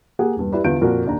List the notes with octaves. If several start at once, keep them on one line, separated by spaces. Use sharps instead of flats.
A#3 G4 G#4 F#5
E1 G2
E4 G4 B4 D5
E2 D3 F4 G6 D7
F2 A#2 F#4 A#4 D5
D#2 D4 A#5